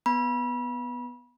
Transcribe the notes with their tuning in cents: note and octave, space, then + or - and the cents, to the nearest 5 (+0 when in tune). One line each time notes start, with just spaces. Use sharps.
B3 +0 B5 -30